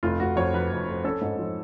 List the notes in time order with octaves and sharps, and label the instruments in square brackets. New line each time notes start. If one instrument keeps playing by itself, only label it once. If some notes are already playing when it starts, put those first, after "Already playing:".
[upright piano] F1 [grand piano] F4
[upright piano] F1 [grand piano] F#4
[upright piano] F2 [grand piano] C#5
[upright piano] F3 [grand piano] B4
[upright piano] F1
F1
[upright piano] C#4 [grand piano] A4
[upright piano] G#2
F3